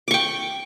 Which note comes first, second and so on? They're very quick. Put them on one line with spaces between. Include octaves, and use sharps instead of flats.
D6 C#6 G5